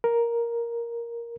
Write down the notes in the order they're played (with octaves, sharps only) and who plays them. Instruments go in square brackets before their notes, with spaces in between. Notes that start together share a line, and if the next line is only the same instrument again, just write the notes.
[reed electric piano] A#4